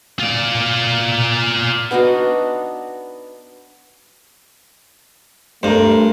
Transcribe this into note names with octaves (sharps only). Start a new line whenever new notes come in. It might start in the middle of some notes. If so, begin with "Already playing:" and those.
F4 D5
B3 D4 D#4 F#4
G2 A3 A#4 C5